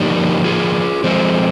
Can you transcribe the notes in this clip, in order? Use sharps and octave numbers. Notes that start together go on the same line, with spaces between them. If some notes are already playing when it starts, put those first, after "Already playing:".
Already playing: D3 F3 A#3 D4 D#4 G4
F4 G#4
F3 G#3 C4